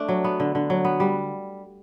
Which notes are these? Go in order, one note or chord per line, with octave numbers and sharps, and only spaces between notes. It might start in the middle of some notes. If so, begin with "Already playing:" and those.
Already playing: A3 D4
F#3
B3
D3
D3
F#3
B3
G3